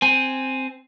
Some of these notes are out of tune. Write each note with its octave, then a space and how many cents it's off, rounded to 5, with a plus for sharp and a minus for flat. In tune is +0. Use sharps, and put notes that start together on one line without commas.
C4 +0 G#5 +0